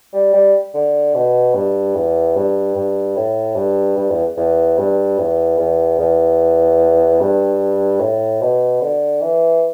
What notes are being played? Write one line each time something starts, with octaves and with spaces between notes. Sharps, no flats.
G3
G3
D3
B2
G2
E2
G2
G2
A2
G2
G2
E2
E2
G2
E2
E2
E2
G2
A2
B2
D3
E3